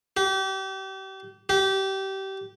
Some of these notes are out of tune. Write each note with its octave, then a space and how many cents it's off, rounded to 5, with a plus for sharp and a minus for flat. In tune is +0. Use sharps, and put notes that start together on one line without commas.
G4 -35
G4 -25